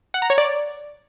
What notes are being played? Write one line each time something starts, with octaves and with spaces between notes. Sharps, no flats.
F#5
A#5
C#5
D5